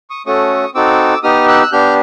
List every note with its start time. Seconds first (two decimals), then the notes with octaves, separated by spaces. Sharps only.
0.10 C#6 D#6
0.26 A3 C#4 F#4 A4 C#6 D#6
0.75 C4 D#4 F#4 A4 D6 E6
1.23 B3 D#4 G4 D#6 F6
1.48 E6 F#6
1.63 F#6
1.72 B3 D4 G4 F6 G6